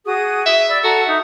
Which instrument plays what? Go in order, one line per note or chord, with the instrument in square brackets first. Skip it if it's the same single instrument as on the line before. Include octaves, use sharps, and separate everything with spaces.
[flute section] F#4 G#4 D#6
[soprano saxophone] E5
[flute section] D5 B5 E6
[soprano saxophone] F#4 [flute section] A4 A#5
[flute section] D#4 E5